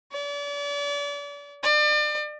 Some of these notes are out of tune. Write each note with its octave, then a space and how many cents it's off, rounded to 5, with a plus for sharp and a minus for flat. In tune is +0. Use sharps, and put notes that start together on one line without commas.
D5 -40
D5 +35